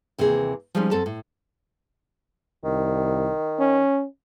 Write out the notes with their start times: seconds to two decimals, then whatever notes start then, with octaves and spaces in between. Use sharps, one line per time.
0.18 D#2 C3 E3 A#3 G#4
0.75 F3 G3 G#3 C4 C#4 D#4
0.91 F#2 C4 A4 A5
1.06 A2
2.64 C2 D#3
3.59 C#4